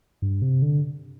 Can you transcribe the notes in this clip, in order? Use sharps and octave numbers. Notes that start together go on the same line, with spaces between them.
G2
C3
D3